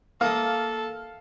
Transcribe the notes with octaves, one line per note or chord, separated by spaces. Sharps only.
A#3 A4 F5 D#6